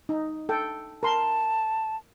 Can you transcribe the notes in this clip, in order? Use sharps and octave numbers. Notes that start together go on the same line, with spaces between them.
D#4
A4 G5
A#4 A5 C6